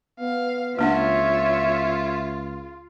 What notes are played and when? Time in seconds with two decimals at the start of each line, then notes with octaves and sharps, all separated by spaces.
0.20 B3 F5
0.79 C#2 A#3 D4 F4 C#5 E5 F#5